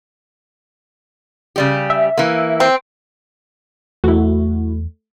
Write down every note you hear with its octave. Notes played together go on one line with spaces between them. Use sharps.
C#3 G3 G4
E5
E3 A#3
C4
E2 A3 E4 F#4